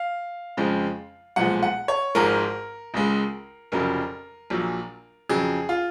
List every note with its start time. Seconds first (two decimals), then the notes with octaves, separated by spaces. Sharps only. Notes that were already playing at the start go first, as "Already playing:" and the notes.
Already playing: F5
0.57 F2 C#3 F3 G#3
1.36 B1 A#2 F3 G#3 F#5
1.63 F#5
1.88 C#5
2.15 G#1 G#2 F3 G#3 A#4
2.94 C#2 C#3 G#3
3.72 F1 F2 C#3 F#3 A#4
4.50 A#1 A#2 F#3
5.29 F2 C#3 F#3 G#4
5.69 F4